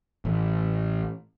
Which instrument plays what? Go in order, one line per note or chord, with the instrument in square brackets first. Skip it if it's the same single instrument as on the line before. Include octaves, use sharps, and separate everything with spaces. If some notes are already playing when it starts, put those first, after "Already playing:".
[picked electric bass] A1